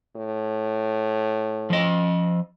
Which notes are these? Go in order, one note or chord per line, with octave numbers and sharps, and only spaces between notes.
A2
F3 D#5